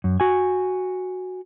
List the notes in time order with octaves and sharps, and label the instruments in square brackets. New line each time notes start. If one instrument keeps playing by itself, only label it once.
[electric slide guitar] F#2
F#4 G#5